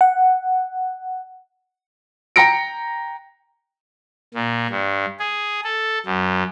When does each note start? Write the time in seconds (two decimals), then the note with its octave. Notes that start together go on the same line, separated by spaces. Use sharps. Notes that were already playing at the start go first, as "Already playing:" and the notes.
0.01 F#5
2.36 G5 A#5 A#6 C#7 D7
4.34 A#2
4.70 G2
5.20 G#4
5.64 A4
6.06 F#2